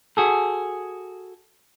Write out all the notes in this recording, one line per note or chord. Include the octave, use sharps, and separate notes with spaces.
F#4 G#4 A4